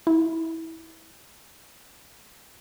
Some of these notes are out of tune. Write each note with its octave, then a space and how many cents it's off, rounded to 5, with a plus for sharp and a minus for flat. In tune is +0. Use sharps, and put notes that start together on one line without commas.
E4 -20